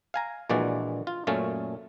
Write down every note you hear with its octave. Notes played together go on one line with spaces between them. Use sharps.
F5 G#5 A#5
A#1 A#2 E3 G#3 F#4 D5
F4
F#2 A#2 A3 C#4 F5 A5